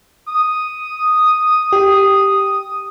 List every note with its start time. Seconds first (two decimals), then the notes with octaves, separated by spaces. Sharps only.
0.28 D#6
1.72 G4